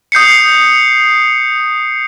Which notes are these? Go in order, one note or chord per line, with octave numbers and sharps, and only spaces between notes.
D#6 G6 C7 C#7